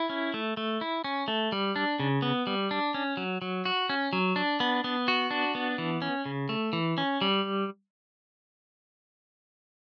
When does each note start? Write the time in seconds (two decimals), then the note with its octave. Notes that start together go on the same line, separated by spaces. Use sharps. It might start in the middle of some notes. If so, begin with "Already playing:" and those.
Already playing: E4
0.10 C#4
0.34 A3
0.57 A3
0.81 E4
1.04 C#4
1.28 A3
1.52 G3
1.76 D4
2.00 C#3
2.22 B3
2.47 G3
2.71 D4
2.94 C#4
3.17 F#3
3.42 F#3
3.65 F#4
3.90 C#4
4.13 F#3
4.36 D4
4.60 B3
4.84 B3
5.08 F#4
5.31 D4
5.55 B3
5.78 E3
6.02 C#4
6.26 C#3
6.49 A3
6.73 E3
6.98 C#4
7.21 G3